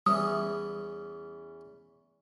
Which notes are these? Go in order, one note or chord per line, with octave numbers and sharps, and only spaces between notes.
E2 E3 G3 C#4 D#6